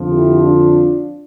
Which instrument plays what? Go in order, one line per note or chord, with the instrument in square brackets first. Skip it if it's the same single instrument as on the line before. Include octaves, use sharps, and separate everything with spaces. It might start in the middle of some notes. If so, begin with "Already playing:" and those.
Already playing: [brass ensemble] F2 D3 F3
E4 G4
D4 F4